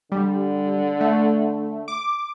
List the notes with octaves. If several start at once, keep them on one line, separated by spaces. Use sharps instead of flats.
D3 G3
A3
D6